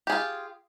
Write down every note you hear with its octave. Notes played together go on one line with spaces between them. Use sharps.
F4 G4 G#4